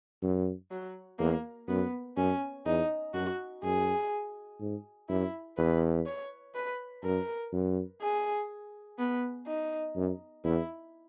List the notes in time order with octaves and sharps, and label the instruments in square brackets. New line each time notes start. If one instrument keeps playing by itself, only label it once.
[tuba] F#2
[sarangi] F#3
[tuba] E2 [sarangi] A#3
[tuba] F#2 [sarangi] B3
[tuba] F#2 [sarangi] C#4
[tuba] E2 [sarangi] D#4
[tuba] F#2 [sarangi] F#4
[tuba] F#2 [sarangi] G#4
[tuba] G#2
[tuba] F#2 [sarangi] E4
[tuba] E2 [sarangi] B4
[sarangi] C#5
B4
[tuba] F#2 [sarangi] A#4
[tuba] F#2
[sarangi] G#4
B3
D#4
[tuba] F#2
[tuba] E2 [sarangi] E4